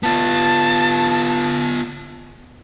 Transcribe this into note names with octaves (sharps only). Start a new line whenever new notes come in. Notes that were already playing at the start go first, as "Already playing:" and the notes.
B3 F4 A5